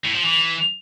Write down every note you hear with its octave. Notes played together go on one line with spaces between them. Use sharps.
A2
F3
E3